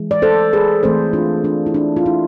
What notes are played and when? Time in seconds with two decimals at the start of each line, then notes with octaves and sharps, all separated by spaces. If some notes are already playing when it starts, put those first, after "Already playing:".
Already playing: E3 G#3
0.11 D5
0.22 A4 C5
0.53 G#4 B4
0.83 E3 A3 C4 A4 C5
1.13 D4 F4
1.44 D4 F4
1.66 E4
1.74 D4
1.96 F4
2.06 E4